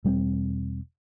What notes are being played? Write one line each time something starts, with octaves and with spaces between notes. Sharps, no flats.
E1 G3 G#3 C4